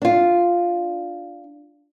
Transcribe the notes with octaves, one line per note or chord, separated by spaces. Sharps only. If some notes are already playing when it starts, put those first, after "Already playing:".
D4 F4